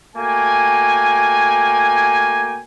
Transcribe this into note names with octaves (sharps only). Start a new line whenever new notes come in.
A3 A#3 F#4 G5 G#5